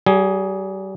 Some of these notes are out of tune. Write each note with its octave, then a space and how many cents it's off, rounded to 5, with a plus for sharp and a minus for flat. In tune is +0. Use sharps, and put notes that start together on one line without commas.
G3 -35 G#4 +5